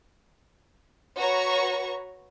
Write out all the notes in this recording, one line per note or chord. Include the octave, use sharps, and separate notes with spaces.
F#4 B4 C#5 A#5 C#6